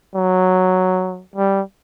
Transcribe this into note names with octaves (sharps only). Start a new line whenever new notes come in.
F#3
G3